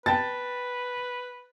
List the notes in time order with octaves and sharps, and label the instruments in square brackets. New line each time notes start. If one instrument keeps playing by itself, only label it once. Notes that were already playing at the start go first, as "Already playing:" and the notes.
[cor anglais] B4 [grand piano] G5 A5 A6